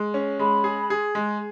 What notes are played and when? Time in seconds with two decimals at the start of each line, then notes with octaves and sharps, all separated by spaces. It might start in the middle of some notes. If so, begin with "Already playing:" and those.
Already playing: G#3
0.14 C#4
0.39 G#3 B5
0.64 G#4
0.90 G#4
1.15 G#3